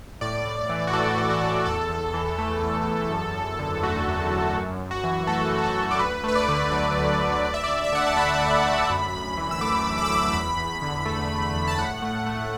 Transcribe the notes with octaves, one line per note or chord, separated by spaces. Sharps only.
A2 D5
A2
E3
F#4
A3 A4
A2
F#4
A2
E2 A4
E2
E3
A3
E2
E2
F#2
F#2
D3
A3 F#4
F#2
F#2
F#2
F#2
F#4
E3
A3 A4
F#2
F#4
A4
F#2
D5
D2 B4
A3 B4
D5
D3
F#3 B4
D2
A3
D2 D5
E5
D2 D5
E5
D3 F#5
A5
A3 B5
D2
D2
F#2
F#2
E3
E6
A3 D6
F#2
D6
E6
F#2 D6
E2 B5
E2
D3
A3
E2
E2
A5
A2 F#5
A3
A3